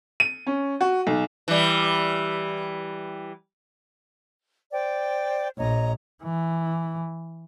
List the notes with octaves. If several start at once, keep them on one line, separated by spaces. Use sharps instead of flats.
D#7
C#4
F#4
B1
E3 G3
C5 D5 G5
A#1 C#5 D#5 A#5
E3